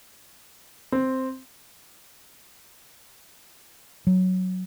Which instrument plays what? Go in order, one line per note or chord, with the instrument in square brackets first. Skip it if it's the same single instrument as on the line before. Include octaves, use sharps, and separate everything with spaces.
[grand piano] C4
[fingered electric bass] F#3